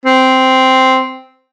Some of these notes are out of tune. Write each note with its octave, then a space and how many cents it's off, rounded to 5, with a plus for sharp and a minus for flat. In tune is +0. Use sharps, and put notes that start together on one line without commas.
C4 -5